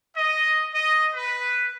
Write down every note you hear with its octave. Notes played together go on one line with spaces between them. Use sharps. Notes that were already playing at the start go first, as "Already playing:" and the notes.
D#5
D#5
B4